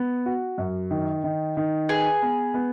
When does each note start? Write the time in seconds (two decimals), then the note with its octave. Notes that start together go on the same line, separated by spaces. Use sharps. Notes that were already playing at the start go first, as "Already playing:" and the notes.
Already playing: B3
0.26 F#4
0.58 F#2
0.91 D#3
1.24 D#3
1.57 D#3
1.89 G#4 B4
2.22 B3
2.54 B3